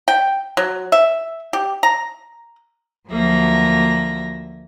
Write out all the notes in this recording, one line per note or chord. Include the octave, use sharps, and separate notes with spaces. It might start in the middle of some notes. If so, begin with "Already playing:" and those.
G5
F#3
E5
G4
A#5
D2 F3 F#3 A#3 E5 A#6